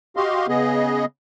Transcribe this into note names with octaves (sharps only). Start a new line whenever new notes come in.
F#4 G4 D#5 F5 C6
C#3 B3 G#4 D#5